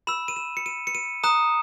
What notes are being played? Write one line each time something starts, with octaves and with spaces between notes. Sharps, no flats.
B5 E6 E7
D#7
E7
C#7
D#7
C#7
D#7
A#5 D#6 F#6 E7